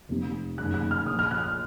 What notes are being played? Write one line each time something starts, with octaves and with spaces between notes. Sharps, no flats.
F1 F2 C3
F#1 F#2 D#3 G#3 F#6
F#6
F6
A#1 A#2 F3 D#6
F6
F#6
F6